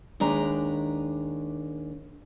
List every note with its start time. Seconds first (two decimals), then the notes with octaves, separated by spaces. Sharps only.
0.20 D#2 G#3 D4 B4 A#5